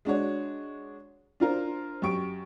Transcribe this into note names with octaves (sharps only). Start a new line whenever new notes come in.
G#3 D4 F#4 C#5
D4 F4 A#4 C5
F#2 G4 C#6 D7